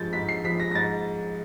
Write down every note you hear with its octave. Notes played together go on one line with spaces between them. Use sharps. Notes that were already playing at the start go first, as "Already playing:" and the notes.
Already playing: G#2 F3 G6 A6
G#2 B6
C7
F3 B6
A#6
A#6
G#2 A6